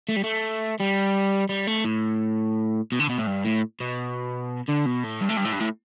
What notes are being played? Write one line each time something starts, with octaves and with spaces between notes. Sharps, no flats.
A3
G3
A3
G3
G3
A3
A2
B2
D3
B2
A2
G2
A2
B2
D3
B2
A2
G2
A2
G2
A2
G2
A2